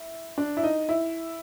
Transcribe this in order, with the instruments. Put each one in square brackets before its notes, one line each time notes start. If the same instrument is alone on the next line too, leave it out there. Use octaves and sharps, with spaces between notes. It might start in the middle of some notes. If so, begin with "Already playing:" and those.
Already playing: [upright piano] E4
D4
E4
D#4
E4